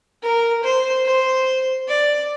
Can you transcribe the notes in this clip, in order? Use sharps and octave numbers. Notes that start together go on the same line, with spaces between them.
A#4
C5
C5
D5